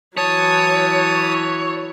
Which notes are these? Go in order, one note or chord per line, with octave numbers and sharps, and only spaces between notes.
E3 F#3 C#5 A5 D#6